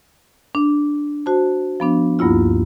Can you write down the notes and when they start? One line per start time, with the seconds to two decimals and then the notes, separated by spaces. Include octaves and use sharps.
0.55 D4
1.26 F#4 C5 A5
1.80 F3 B3 D4
2.19 D2 G2 A#3 E4 F4